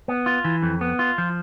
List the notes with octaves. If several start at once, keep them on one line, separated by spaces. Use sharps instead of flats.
B3
F4
E3
F2
B3
F4
F3